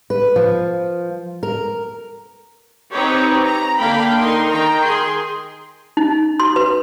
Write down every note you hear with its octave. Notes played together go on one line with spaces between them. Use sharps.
B4
F3
A#4
C4 D#4 G4 B4 C#5
A#5
D3 A#3 F5 G5 B5
D#4 A#4 C6
D#3 G5 A#5
G#4 C6
D#4
C6
B4